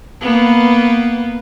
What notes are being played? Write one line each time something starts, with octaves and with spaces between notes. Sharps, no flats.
A#3 B3